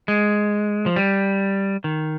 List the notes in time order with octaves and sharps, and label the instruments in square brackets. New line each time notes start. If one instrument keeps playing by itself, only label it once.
[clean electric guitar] G#3
F3
G3
D#3